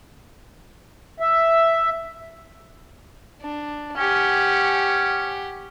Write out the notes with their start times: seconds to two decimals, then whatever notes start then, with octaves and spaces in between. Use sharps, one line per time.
1.20 E5
3.42 D4
3.97 C#4 G4 F#5